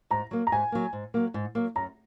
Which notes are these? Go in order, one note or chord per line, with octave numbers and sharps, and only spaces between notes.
G#2 A#5
F#3 A#3
A#5
G#2 G#5
F#3 A#3
G#2
F#3 A#3
G#2
F#3 A#3
F#2 A#5